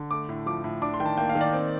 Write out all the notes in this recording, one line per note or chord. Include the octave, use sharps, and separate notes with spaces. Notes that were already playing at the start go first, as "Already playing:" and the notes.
Already playing: D3
A3 D6
A2
F3 D6
A2
D4 D6
C6
D#3 G5
A5
A#3 G5
F5
D#3
D5
C4